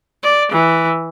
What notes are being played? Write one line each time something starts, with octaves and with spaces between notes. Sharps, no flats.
D5
E3